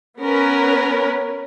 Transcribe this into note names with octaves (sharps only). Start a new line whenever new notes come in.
B3 C#4 A#4 B4